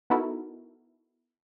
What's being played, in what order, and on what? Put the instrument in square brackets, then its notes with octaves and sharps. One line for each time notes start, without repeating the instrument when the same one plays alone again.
[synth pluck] B3 D#4 E4 F#4 A4 A#4